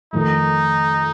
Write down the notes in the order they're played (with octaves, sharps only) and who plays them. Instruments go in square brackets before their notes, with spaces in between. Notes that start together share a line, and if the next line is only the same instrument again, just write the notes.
[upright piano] F2 D#3 A3 [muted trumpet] D#4